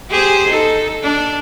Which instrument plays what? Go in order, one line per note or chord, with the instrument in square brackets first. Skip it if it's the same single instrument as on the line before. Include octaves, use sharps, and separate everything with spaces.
[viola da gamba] G4 G#4 C5
D#4 A4
D4